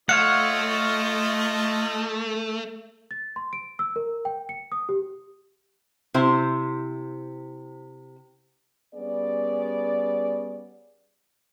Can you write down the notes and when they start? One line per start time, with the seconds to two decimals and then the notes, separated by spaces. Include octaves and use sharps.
0.09 A3 F4 C#5 D#5 F5 F#5 C#7
3.11 A6
3.36 C6
3.53 D7
3.79 E6
3.96 A#4
4.25 G5
4.49 C#7
4.72 D#6
4.89 G4
6.14 C3 E4 C5
8.94 G3 B3 C#4 G#4 D5